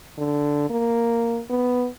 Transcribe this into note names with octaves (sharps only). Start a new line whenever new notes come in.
D3
A#3
B3